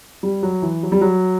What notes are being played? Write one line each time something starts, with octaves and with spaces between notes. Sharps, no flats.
G3
F#3
E3
F#3
G3
F#3